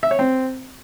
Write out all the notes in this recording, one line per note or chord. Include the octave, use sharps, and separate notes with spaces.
E5
C#5
C4